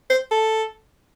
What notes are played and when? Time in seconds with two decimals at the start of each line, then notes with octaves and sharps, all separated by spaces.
0.10 C5
0.31 A4